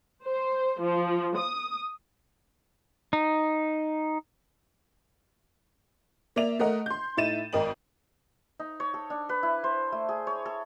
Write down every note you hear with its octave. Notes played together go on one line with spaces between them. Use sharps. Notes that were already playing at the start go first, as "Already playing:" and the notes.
C5
F3
D#6
D#4
A#3 D5 E5 F7
A3 A#4 D#5 F#5
C6 G6
A2 D#4 E5 A6 D#7 E7
G#1 A#4 D#5 G5 F#7
D#4
C#5
A4
D4
B4
E4
C5
A3
G#4
C#5
A4